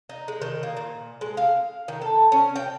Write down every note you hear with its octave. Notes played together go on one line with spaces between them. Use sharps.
D#4
G#3
D#3
A#3
A#2
G#3
F5
D#3
A4
C#4
G5